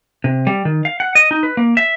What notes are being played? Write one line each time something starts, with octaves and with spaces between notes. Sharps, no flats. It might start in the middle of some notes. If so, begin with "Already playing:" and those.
C3
G3
D#3
F5
F#5
D#5
D#4
B4
A#3
E5